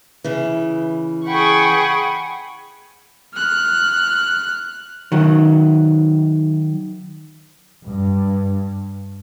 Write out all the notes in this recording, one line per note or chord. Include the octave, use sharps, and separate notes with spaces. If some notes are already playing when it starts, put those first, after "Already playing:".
C#3 E3
G#4 F#5 G5 B5 C#6
F6 F#6
D#3 F#3
G2